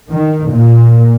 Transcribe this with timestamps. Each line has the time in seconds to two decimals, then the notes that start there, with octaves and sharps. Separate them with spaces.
0.11 D#3
0.48 A#2